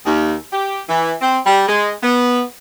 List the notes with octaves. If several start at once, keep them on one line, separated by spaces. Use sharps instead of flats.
D#2
G4
E3
C4
G3
G#3
B3